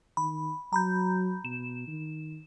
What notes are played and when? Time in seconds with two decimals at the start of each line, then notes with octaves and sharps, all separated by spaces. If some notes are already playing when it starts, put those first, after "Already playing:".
0.17 D#3 B5
0.73 F#3 A#5 B5 G6
1.45 B2 E7
1.87 D#3